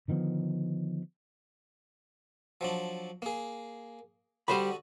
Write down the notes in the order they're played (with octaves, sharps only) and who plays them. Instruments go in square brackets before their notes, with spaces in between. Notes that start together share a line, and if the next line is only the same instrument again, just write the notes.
[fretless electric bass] D3 D#3 F3 B3
[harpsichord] F3 F#3 D4
A#3 G#4
[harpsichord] D3 F#4 D#5 [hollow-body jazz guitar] G3 C5 B5